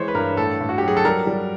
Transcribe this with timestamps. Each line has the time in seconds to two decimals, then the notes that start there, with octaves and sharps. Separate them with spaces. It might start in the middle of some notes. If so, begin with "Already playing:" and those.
Already playing: E3 G#3 C5 C#5
0.08 B4
0.15 G2 A#4
0.37 A2 A4
0.61 A2
0.69 F#4
0.78 G4
0.83 F#3 G#4
0.97 A4
1.05 G3 A#4
1.27 G3